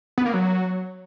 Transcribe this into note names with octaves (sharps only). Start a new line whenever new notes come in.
B3
A#3
F#3